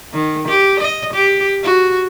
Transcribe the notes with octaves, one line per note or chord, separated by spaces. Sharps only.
D#3
G4
D#5
G4
F#4